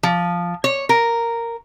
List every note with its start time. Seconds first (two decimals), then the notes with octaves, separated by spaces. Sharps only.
0.03 F3
0.64 C#5
0.89 A#4